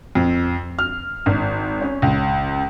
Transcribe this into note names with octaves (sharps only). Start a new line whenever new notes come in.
F2
F6
G#1
C#4
C#2